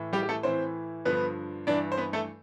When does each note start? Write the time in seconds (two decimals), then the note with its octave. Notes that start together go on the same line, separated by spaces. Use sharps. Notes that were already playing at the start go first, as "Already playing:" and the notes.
Already playing: A2 E3
0.13 G3 G4
0.23 G4
0.29 A3 A4
0.43 A2 E3 C4 C5
1.05 G2 D3 F3 B3 B4
1.67 G2 E3 D4 D5
1.92 C5
1.98 B3 B4
2.13 A3 A4